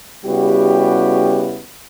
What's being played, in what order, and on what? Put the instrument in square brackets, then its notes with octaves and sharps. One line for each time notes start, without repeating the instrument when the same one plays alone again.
[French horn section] C#3 G3 B3 E4 F#4 G4